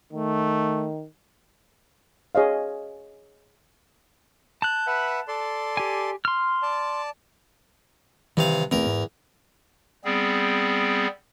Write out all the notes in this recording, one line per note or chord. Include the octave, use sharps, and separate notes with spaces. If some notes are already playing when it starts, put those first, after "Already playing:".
D#3 A3
G#4 C#5 D#5 F5
A5 F#6 G6
B4 E5 F#5
A4 D5 C6
G4 G#5
C6 F6
D5 A5
G2 C3 D#3 E3 F5
D#1 E2 A3 C4 A#4
G#2
G3 B3 C4 G#4